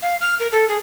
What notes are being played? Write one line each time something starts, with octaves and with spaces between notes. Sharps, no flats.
F5
F6
A#4
A4
G#4